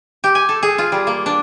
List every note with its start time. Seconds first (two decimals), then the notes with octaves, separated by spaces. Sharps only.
0.24 G4
0.35 G#5
0.49 A4
0.63 G#4
0.78 F4
0.92 G3
1.07 A#3
1.26 D4